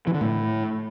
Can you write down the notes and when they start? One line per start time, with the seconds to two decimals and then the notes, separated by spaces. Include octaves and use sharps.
0.07 E3
0.14 D3
0.21 A2